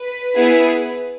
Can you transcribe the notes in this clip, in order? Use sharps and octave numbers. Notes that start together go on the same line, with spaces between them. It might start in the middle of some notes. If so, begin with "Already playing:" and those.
Already playing: B4
B3 E4 G#4